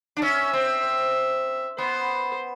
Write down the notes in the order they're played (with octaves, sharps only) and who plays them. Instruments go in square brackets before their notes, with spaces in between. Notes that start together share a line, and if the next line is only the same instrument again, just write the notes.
[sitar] D4
[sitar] C#4 [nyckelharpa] E5
[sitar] C4
[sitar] B3 [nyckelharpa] C5